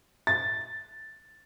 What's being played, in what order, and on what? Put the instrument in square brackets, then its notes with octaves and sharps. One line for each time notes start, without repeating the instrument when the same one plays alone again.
[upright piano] A6